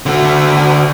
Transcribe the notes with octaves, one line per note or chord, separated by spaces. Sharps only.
D3 F#4